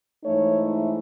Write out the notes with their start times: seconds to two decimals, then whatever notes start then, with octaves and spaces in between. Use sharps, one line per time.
0.24 G#2 E3 A3 D#4 C#5